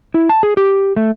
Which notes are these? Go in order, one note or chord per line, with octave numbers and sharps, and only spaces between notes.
E4
A5
G#4
G4
A3